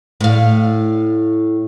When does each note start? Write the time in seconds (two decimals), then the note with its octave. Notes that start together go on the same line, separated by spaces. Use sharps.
0.21 A2 F5